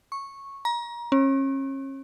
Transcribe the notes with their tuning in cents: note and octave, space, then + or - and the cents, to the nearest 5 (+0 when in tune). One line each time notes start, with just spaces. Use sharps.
C#6 -10
A#5 +30
C#4 -35